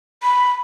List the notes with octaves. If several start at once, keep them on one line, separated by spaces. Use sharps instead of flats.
B5